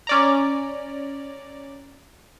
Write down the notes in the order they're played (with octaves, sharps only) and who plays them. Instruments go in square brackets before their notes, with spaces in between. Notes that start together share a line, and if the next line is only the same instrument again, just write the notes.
[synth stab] C#4 D5 A#5